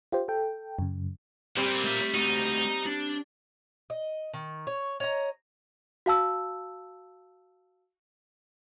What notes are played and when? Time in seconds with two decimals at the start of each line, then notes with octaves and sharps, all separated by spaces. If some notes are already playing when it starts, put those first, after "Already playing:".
0.12 F4 G4 C5
0.28 A4 G5
0.79 F#2 C#3
1.57 A#2 G3 C4
1.85 A3 E5
2.14 A3 D#4 F#4
2.86 D4
3.90 D#5
4.34 D#3
4.67 C#5
5.00 C#5 D#5 A#5
6.06 F#4 F5 A5 E6